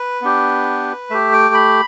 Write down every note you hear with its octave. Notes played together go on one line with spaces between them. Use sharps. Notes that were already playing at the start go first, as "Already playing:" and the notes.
Already playing: B4
B3 D4 G4
A3 G4 E5
G5
B5